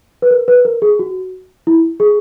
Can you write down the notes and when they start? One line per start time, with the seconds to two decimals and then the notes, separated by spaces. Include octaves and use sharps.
0.22 B4
0.31 A#4
0.48 B4
0.65 A#4
0.82 G#4
0.99 F#4
1.67 E4
2.00 G#4